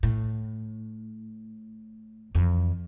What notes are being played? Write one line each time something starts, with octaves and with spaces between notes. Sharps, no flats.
A2
F2 E3